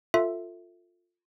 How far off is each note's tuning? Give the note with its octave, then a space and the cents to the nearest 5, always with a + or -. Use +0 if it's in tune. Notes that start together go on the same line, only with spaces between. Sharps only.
F4 +10 A4 +25 E5 +0